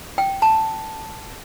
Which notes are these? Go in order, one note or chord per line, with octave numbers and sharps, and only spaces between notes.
G5
A5